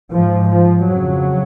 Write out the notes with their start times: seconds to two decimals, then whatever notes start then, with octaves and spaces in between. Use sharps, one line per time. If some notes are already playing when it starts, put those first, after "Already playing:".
0.12 G#2 F3
0.49 F3
0.86 F2 C#3 F#3